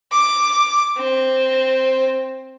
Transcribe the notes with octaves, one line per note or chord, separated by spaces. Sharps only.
D6
C4